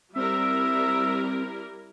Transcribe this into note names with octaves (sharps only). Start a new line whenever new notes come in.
G3 C4 E4 A#4 E5